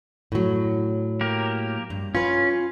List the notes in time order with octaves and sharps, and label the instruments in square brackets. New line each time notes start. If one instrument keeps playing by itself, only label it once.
[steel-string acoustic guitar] A2 F#3
[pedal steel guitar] A#3 G4 A#4
[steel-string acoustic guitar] G2
[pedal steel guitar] C#4 [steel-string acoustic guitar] F4 B4